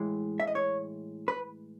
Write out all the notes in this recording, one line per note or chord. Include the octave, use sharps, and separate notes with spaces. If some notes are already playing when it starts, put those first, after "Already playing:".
Already playing: A2 E3 G#3
E5
D#5
C#5
B4